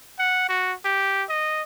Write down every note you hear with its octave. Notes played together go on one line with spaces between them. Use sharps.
F#5
F#4
G4
D#5